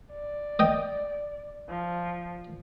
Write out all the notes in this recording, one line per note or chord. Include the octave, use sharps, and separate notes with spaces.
D5
D#5 G5
F3